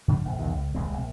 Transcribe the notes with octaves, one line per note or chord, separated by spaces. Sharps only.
G#2 C#3 F3 D4
F1 A#1 F3
B1 E2 C3 D#3
C#2
D#1 C2 G#3 C4
A#1